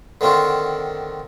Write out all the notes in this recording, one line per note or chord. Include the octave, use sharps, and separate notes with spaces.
D3 D#3 C4 F4 F#4